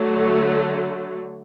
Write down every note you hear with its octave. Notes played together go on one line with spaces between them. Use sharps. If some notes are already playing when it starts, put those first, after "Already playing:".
Already playing: D3 F#3 A3